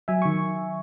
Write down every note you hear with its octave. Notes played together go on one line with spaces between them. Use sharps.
F#3 E5 G#5
D#3 C#6